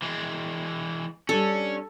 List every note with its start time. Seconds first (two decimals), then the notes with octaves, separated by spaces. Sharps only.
0.02 E3 G#3
1.29 G3 C#4 D4 A4